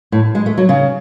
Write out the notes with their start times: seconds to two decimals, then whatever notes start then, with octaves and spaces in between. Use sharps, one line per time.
0.12 A2
0.35 G#3
0.46 A3
0.57 F#3
0.69 C#3